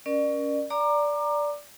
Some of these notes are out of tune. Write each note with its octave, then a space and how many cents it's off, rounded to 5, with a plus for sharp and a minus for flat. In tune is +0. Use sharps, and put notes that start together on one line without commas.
C#4 +15 A#4 +30 D5 +30
D5 -5 A#5 +0 D6 +25